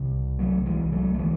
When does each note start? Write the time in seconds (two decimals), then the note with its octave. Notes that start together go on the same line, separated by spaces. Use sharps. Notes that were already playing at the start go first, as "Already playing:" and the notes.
Already playing: C2 C3
0.39 F#3 A3
0.66 E3 G#3
0.92 F#3 A3
1.15 A3
1.19 E3 G#3